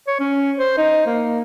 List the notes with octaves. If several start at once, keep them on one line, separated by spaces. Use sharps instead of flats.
C#5
C#4
C5
D#4
A#3